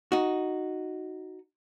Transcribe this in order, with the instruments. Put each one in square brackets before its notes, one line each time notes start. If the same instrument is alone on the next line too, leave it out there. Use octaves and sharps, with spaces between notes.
[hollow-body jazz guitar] D#4 F#4